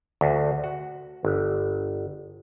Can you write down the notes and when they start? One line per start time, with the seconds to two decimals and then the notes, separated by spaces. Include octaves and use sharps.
0.21 D2
0.64 F#4
1.25 G1